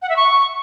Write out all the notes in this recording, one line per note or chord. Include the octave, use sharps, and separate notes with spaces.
F#5
E5
C#6